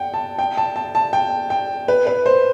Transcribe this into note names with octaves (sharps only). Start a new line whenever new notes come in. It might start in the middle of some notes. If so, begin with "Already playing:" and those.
Already playing: F#5 G5
A5
G5
A5
A5
A5
G5
G5
B4
B4
C5